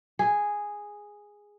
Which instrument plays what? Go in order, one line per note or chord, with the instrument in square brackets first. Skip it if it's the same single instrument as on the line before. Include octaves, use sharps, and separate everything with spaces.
[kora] G#4